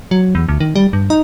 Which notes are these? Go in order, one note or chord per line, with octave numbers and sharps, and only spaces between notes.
F#3
E2
D2
D#3
G3
G2
D#4